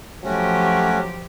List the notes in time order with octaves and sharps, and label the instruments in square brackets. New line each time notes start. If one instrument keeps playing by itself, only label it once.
[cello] F3 G4 [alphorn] F#3 [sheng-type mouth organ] A3 C#4 F#4